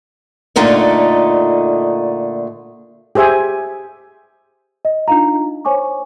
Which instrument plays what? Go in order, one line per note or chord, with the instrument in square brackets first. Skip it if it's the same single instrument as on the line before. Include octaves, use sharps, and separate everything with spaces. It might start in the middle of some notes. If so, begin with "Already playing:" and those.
[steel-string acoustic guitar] A#2 D3 A3 D#4
[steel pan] G4 G#4 C5 E5 G#5
[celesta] D#5
D4 D#4 F4 F5 A#5
C5 C#5 G#5 C#6 D6